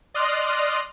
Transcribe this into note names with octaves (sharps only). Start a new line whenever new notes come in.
D5 D#5 C6 D#6 F6 F#6